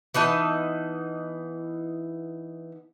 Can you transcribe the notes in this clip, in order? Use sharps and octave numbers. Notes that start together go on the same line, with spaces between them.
E3 B3 D#4 A5